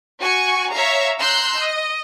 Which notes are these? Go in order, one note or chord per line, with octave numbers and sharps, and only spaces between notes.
F#4 G#5 C#6
C#5 E5 F5 A#5
A#5 C6 E6 F#6 G6
D#5